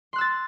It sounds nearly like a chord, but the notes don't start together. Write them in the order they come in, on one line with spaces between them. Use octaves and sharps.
C6 F#6 E6 A6